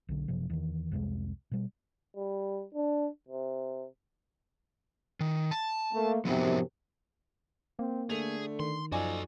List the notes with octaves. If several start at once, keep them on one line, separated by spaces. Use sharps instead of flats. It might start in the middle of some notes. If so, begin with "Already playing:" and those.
B1 D3
F#1 C3 F3
E2 D#3
C2 F2 C3 G#3
B2 G3
G3
D4
C3
D#3
A5
A3 A#3
F#2 C3 F3 B3 D#4
A#3 C4
D3 A3 G#4 F7
D#3 C6
F#2 F3 D#4 F#4 A4 D5 G#5